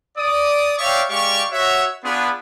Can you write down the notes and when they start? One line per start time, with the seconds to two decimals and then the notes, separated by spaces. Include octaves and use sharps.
0.17 D5 D#6
0.78 C#5 D5 E5 F5 G5 C#6
1.09 G#3 G4 D5 F5 C#6
1.51 F#4 C#5 E5
2.03 B3 D4 F4 G#4 B4